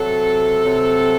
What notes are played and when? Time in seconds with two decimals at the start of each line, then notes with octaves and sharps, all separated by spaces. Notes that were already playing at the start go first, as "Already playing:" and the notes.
Already playing: C3 F#3 A4
0.64 C3 F#3